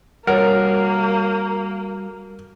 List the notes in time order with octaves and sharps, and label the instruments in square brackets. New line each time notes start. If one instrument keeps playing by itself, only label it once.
[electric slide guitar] G3 F#4 A4 [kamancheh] A#3 [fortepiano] A#4 [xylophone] C#5 F#5